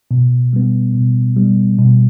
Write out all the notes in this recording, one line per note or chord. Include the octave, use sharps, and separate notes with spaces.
B2
G3 B3
B2
G3 B3
B2